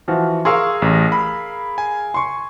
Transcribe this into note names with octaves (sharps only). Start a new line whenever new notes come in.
E3 F3 F#4
G#4 A#4 F5 C6 C#6 E6
A1
B5
G#5
C6 C#6